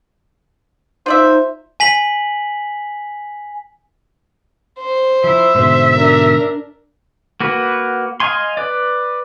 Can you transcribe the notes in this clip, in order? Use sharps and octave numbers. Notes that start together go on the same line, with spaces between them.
D#4 F4 C5 D5 E5
G#5 B6 F#7
C5
F3 E4 E5
G#2 B2 D3 C5
D4 A#4
A#3 F#4 B4
D#5 F5 G#5 C6
B4 D5